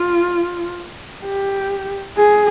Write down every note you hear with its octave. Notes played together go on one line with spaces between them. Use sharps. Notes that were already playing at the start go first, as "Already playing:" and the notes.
Already playing: F4
G4
G#4